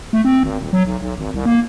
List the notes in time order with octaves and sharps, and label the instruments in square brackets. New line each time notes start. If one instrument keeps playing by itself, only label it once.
[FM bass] A3
C4
G#1
D#1
F#3
B1
B1
G#1
C2
A#3